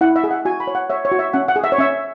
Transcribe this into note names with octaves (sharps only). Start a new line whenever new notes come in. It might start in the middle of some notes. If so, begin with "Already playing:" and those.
E4 F#5
E5
G#4
F#5
F#4 G#5
B5
C#5
F#5
C#5 E5
C#5
F#4
E5
C#4 F#5
F#5
G#4
E5
C#5
C#4 E5